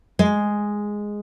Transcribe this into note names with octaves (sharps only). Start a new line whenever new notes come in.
G#3